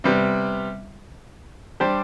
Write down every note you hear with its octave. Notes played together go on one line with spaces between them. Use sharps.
C3 G3 B3
G3 D4 G4 C5